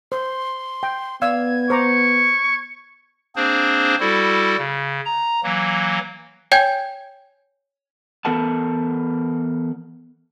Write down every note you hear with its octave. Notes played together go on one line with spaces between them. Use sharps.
C5 C6
G5
B3 D5 F5 E6 G#6
C5 A#5 C#6 D6
A#3 C4 D4 G#4 C5
G3 E4 F#4 A4
C#3
A#5
E3 F#3 A#3
C#5 G5 G#5 G6 G#6
E3 B3 A4 A#4 F#5 A5